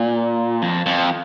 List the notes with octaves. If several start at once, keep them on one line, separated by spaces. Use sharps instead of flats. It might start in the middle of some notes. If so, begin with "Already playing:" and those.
Already playing: A#2
F2
F2